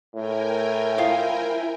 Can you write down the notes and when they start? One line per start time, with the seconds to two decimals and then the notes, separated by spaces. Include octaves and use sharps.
0.15 A2 A#4 G5 G#5
0.98 E4 F4 C5 D#6